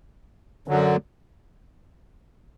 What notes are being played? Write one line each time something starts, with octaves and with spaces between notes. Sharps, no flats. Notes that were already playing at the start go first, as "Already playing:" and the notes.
F#2 D3 F#3